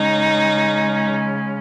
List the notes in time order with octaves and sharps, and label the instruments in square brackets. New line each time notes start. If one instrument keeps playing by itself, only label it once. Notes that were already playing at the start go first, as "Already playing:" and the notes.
Already playing: [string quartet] C#3 G#3 C#4 D#4